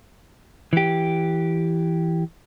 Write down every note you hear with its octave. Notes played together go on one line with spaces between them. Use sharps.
E3 G4